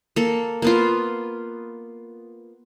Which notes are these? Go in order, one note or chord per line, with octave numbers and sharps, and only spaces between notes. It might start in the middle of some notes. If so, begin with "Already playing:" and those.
A#3 A4
A#3 B3 F4